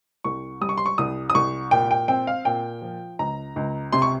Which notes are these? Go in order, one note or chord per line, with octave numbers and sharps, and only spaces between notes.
C2 C#6
G3 D#6
C#6
C6
C#6
C2 D#6
D#6
C2 C#6
A#2 G5
G5
C4 G5
F5
A#2 G5
F3
C#2 A#5
C#2
C3 C6
C#6